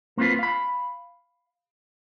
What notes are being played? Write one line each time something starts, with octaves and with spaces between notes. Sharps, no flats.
A#3 C4 D4 F4 B4
F5 B5